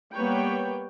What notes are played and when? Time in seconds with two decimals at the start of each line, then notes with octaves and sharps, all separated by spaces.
0.13 G3 A#3 B3 B4 C#5 G5